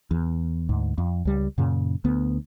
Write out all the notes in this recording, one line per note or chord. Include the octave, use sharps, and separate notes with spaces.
E2
D2 G#2
F2
C#2 G3
F#2 A#2 C#3
D2 B3